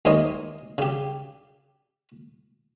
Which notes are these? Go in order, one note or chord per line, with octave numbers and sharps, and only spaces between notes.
D#2 E3 A#3 C5 C#5 D#5
C#3 G4